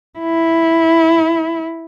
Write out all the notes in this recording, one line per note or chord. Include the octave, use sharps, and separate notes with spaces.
E4